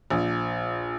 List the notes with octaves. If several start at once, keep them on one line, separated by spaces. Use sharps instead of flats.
A#1